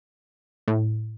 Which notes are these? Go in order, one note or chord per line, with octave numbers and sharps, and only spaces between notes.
A2